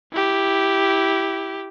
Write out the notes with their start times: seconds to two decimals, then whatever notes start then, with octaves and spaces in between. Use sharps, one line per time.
0.12 E4 G4